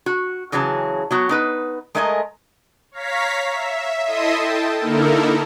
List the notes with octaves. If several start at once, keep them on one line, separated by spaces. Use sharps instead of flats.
F#4
C#3 E3 F#3 G#4 A5
F#3 B3 F#4
B3 D#4 B4
G#3 A3 A#4 D#5 F5 G#5
C#5 F5 A#5 B6
E5
E4 A4 D#5 E5 C6 D#6
G5 A5
D3 A#3 D#4 E4 A4 A#4